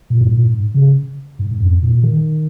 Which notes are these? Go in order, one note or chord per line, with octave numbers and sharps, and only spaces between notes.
A#2
G#2
A#2
G#2
C#3
G#2
G#2
F2
A#2
D#3